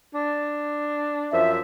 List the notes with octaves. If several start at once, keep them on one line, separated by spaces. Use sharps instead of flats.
D4
F#2 F3 E5